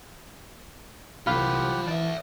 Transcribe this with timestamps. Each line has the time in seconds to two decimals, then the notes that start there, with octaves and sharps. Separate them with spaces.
1.27 C2 E3 F4 G4 F5 F#5 B5 F6
1.87 E3 D5 E5 A5